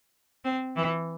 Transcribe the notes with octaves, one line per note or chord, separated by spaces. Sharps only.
C4
E3